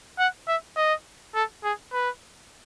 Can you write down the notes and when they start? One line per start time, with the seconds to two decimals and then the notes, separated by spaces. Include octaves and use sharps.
0.19 F#5
0.48 E5
0.77 D#5
1.35 A4
1.64 G#4
1.92 B4